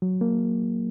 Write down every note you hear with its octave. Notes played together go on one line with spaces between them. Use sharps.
F#3
A#3